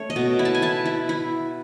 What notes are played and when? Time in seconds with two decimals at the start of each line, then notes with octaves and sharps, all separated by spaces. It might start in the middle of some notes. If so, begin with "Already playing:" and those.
Already playing: A3 C#4 C#5
0.10 D#5
0.16 B2
0.39 E4
0.45 A5
0.55 G#5
0.62 E4 A5
0.86 E4
1.09 E4